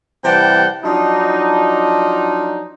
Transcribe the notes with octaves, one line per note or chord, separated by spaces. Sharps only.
C3 E3 G3 F#5 G5 A5
F3 F#3 D4 D#4